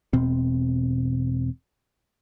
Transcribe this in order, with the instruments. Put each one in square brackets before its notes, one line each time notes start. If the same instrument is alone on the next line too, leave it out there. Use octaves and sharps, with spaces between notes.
[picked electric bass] E1 B2 C4